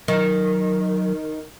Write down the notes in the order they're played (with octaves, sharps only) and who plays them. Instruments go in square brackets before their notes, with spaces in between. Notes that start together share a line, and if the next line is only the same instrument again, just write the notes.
[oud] D#3 [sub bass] F#3